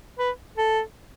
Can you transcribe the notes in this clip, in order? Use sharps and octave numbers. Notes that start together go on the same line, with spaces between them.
B4
A4